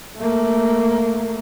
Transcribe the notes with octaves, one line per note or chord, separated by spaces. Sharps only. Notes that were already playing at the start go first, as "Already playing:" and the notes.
A3 A#3